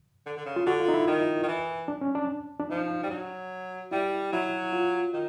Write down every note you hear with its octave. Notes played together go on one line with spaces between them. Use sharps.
D3
D3
C#3
F4
D3 F#4
F4
D#4
E4
D#3
D#3
E3
D4
C#4
D4
D4
F3 D#4
G3
F#3
G3 E4
F#3 E4
F4
D#3